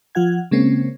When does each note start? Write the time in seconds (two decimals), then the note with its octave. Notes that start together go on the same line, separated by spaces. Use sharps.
0.15 F3 F4 F#5 G#6
0.51 C#3 G#3 A#3 C4 C#4